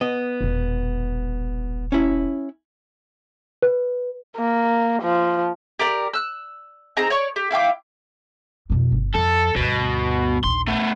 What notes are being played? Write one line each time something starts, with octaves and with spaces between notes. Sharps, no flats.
B3 D#5
E1 A#1
C#4 E4
B4
A#3
F3
G4 A#4 D5
E6 F#6
C4 D#4 G#4 A#5
C#5 D5 C#6
G4
E4 F5 G5 D6
F2 B2
G1
F2 A4
D2 G2 B2
A#1 D#2 C6
A3 B3